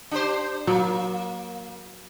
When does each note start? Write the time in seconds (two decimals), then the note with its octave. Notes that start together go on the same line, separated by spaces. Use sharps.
0.11 D4 G4 C5
0.67 F#3 A#3